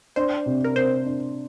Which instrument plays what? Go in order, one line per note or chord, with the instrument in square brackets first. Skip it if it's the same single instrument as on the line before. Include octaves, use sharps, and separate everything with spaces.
[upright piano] D4 [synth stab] C5
[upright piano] C3
[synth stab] A#4
[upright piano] C3 [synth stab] C5
[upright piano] D4